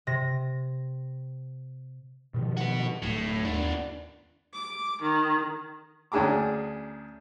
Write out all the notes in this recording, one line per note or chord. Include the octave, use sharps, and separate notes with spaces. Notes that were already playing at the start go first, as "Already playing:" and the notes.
C3 A#6
B2 D#3 F3
F#4 B4
D1 A2
D#2 B3 D4
D6
D#3
D2 C#4 D4 G#4 A#5 D6